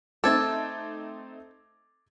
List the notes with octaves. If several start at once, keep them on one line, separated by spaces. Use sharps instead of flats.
A3 C4 D#4 A4 D6 G#6 A6